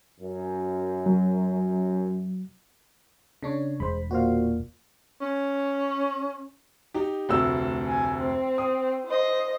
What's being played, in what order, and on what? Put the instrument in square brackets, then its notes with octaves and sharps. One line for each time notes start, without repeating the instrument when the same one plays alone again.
[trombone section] F#2
[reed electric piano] F#3
[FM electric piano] C#3 D4 C#5
[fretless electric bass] E1 [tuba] G#3 [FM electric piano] C5 B5
[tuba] A#2 [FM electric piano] F#4 C5 F5
[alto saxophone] C#4
[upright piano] D#4 G4
F1 D2 E6
[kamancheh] G#5
C4
[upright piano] D#6
[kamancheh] C5 D#5